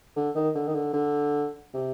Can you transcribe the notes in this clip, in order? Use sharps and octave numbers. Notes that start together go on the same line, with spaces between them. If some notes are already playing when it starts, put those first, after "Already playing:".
D3
D#3
D3
D#3
D3
D3
C3